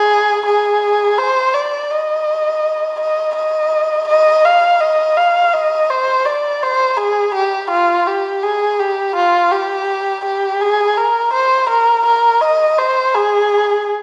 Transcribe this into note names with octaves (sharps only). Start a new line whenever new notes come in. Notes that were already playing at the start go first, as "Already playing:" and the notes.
Already playing: G#4
G#4
C5
D5
D#5
D#5
D#5
D#5
F5
D#5
F5
D#5
C5
D5
C5
G#4
G4
F4
G4
G#4
G4
F4
G4
G4
G#4
A#4
C5
A#4
A#4
D#5
C5
G#4